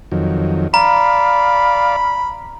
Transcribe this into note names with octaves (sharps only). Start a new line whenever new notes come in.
F2 D#3 F#3
D5 F5 A#5 B5